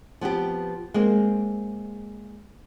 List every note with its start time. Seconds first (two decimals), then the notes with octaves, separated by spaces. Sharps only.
0.21 F3 B3 C4 G4
0.94 G#3 A#3 C4